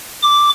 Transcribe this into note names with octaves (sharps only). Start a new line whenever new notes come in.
D6